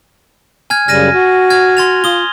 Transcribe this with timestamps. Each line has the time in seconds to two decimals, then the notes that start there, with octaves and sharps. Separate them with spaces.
0.70 G#5 F6 G#6
0.88 F#2 C#3 G3 F6 A#6 D#7
1.14 F#4
1.50 F6 G#6
1.77 C6 A6 F7
2.04 F4 D#6 G7